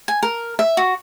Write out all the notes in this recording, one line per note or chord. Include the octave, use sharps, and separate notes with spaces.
G#5
A#4
E5
F#4